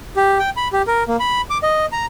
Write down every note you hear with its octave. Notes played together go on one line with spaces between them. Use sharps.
G4
G5
B5
G4
A#4
A#3
B5
D6
D#5
A#5